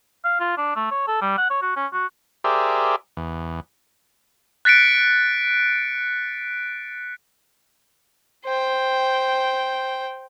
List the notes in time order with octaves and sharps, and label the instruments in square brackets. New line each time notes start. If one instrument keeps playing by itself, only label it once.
[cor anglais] F5
F4
D4
A3
C#5
A4
G3
F#5
C#5
F#4
C#4
F#4
[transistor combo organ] G4 G#4 A#4 C5 D5 E5
E2
[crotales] F#6 A6 B6 C#7 D7
[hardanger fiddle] C5 G5